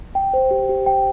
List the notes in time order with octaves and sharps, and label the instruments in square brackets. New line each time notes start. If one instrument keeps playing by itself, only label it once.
[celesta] G5
C5
G4
G4
G5